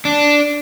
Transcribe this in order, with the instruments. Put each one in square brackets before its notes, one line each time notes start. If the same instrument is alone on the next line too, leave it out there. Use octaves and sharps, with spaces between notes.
[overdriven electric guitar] D4